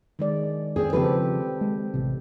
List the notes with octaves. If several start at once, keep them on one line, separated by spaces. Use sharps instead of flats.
D#3 G#3 D5
F2 C4 G#4
C#3 F3 C4 G4 A4 B4
G#3
A1 C3